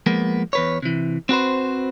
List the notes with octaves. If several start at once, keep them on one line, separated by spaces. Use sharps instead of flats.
F3 G#3 A#3 B3
E2 B4 C#5
C3 E3
C4 F#4 B4 C5